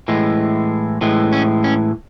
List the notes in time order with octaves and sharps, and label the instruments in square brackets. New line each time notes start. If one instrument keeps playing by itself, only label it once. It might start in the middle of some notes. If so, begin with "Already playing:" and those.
[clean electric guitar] A2 E3 G#3
A2 E3 G#3
C#4
C#4